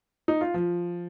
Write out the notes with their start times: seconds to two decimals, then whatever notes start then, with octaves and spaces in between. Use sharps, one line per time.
0.28 D#4
0.41 F4
0.54 F3